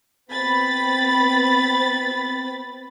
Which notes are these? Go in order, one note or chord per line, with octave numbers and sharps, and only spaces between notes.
B3 C4 B5 A6